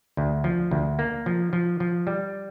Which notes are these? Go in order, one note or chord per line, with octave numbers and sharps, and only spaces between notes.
D2
F3
D2
A#3
F3
F3
F3
G3